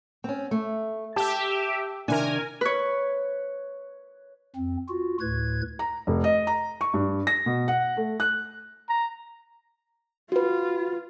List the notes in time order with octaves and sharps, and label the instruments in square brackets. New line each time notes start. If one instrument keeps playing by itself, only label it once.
[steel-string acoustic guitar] C4 C#4
A3
[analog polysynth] G4 E5 [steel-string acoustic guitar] A5
[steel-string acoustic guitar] C3 D#3 D4 [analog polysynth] A#4 G#5
[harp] B4 C#5
[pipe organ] F2 C4
F4 F#4
D2 A2 B4 G#6
[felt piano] A#5
F1
D#5
A#5
C#6
G2
A#6
B2
F#5
A3
F#6
[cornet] A#5
[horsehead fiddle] F4 [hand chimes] F#4 B4